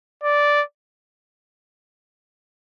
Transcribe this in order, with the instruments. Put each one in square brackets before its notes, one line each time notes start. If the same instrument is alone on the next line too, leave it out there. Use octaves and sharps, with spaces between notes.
[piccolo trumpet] D5